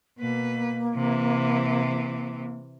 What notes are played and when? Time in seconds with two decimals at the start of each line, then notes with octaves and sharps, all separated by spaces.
0.18 B2 A#3 B4
0.95 C3 E3